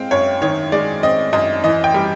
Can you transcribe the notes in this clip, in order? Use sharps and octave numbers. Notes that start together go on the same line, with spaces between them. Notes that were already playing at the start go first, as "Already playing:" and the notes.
Already playing: G#3 C4 F5 G5
F#2 C#5
D#3 C#5
G#3 D5
C4 D#5
F#2 D#5
E3 D#5
G5
G3